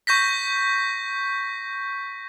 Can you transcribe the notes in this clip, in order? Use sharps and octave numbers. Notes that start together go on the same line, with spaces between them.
C#6 G6 A#6 B6